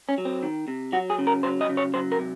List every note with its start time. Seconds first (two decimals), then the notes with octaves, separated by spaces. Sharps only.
0.09 C#4
0.18 F#3
0.25 C4
0.43 D#3
0.68 C3
0.92 F#3 F#4
1.10 G#4
1.18 C#3
1.27 A#4
1.43 F#3 C5
1.61 D#5
1.69 C#3
1.77 C#5
1.94 F#3 C5
2.12 A#4
2.19 C3